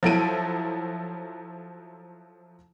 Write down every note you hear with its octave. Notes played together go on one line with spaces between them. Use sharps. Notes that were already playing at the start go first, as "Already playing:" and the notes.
F3 F#3 E4 A4 D7 D#7